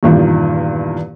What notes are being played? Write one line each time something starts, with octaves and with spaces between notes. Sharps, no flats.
E2 G2 A#2 D#3